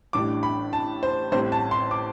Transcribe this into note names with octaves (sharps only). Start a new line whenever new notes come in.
A1 A2 G3 D4 D6
B5
A5
C5
A1 A2 G3 C4 C5
A5
C6
D6